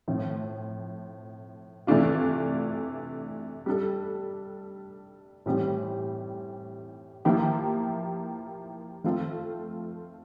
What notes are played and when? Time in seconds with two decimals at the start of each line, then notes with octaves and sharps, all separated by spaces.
0.08 A2 F3 C4
1.87 C3 E3 A3 D4 F4
3.66 G3 D4 A4
5.46 A2 E3 G3 C4 G4
7.25 F3 A#3 E4 G4
9.04 F3 A3 C4 F4 A4